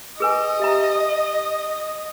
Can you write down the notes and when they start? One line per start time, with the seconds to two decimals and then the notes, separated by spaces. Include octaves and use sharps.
0.20 G#4 B4 D#5 G#5
0.59 G4 E5 A#5